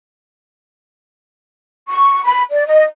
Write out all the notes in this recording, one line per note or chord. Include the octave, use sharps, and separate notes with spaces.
C#6
B5
D5
D#5